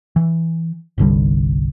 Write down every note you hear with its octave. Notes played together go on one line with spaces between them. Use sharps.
E3
G1 C2 D3 G3